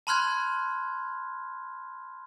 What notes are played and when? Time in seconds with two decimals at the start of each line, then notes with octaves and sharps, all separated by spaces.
0.07 A5 B5 C6 F6 F#6 G#6